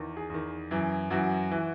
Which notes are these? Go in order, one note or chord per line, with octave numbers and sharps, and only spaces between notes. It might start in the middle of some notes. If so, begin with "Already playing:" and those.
Already playing: E2 D#3
G#4
E2 D#3
F#2 E3
F#2 E3 F#4
E3